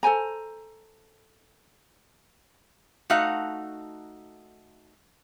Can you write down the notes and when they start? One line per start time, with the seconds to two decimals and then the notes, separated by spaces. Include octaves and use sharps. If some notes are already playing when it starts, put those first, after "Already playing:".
0.03 A4 C5 G#5 A#5
3.10 A3 D#4 F#4 F5 F#5